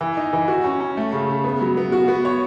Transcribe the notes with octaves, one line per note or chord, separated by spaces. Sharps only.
E3
D#4
E3
F#4
C#4
C#4
A3
C#3
C#3
B3
F#3
B3
F#4
B3
C#5